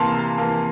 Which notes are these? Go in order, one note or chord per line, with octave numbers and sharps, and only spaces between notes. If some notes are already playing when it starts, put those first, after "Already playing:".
Already playing: C3 E3 A#3 F5 A5 A#5 C6
C3
E3 A#3